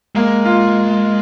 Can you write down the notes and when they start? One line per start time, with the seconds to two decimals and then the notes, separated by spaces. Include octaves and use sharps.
0.15 G#3 A#3
0.45 F4